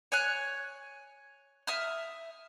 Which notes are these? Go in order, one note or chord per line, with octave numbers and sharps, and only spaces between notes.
C#5 G#5 F#6
E5 D#6 F6